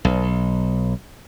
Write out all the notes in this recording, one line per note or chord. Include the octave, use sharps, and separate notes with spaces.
B1